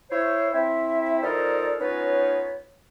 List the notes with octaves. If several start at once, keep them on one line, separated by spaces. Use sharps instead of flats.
E4 C5 C#5
C4 E4 E5
F3 D#4 A4 A#4 C5 D5
B3 C#4 D#4 F4 B4 C#5